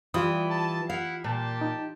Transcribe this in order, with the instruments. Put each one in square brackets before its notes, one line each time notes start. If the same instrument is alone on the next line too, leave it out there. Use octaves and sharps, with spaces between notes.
[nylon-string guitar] E3 [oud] G3 [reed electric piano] F4 D#6
[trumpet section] A5
[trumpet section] E4 F#5 [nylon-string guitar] F5
[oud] A#2 [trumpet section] G4 A5
[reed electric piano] D#4